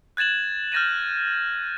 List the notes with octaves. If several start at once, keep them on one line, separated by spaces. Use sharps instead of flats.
F#6 G#6 A6 E7 F#7
F6 G6 A6 A#6 D#7 E7